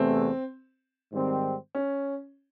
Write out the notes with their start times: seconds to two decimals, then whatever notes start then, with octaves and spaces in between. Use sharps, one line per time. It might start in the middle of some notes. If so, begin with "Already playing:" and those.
Already playing: E2 C3 E3 A3 C4
1.11 G#2 D#3 G3 C4
1.75 C#4